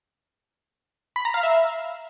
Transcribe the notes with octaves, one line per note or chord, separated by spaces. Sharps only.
B5
A#5
F5
E5